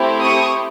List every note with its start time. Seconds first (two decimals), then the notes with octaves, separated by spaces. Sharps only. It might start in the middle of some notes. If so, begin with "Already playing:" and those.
Already playing: A3 C4 E4 G4
0.22 C#6 D#6